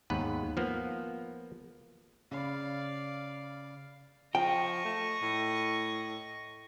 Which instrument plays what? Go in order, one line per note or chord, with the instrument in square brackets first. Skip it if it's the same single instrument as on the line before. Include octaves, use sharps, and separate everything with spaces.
[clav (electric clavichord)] D#2 G#2 B3 B4
F3 A#3 B3
[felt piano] C#3 B5 [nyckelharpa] D5 F5
[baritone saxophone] F3 [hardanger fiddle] D#5 C#6 [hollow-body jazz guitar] G5
[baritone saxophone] A3
A2